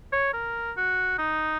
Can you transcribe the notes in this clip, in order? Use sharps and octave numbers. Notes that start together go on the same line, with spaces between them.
C#5
A#4
F#4
D#4